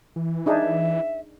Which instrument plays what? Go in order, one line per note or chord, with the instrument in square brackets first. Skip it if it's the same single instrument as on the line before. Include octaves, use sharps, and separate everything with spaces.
[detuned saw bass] E3
[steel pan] D4 D#4 G#4 [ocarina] E5